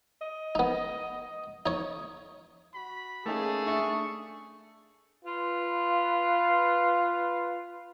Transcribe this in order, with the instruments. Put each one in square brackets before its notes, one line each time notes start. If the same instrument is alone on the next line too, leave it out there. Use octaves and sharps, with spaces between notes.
[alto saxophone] D#5
[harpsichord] B3 D#4
D#4 C#5
[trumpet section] F#4 B5
[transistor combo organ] A3 [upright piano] A#3 C#4 D#4 [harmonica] G#4
[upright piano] D4 E5 A6 [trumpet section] C#6
[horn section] F4 B4